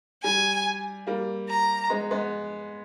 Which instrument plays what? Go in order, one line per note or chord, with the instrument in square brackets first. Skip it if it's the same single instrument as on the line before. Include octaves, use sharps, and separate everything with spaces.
[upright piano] G3 [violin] G#5
[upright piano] G3 A#3
[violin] A#5
[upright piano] G#3 B3
G#3 B3